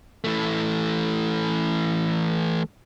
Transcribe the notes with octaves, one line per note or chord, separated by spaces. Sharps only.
E3 A3